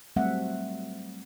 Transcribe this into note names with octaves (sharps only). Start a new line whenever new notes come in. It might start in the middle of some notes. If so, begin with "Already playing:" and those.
F#3 G3 A3 C4 E5 F#5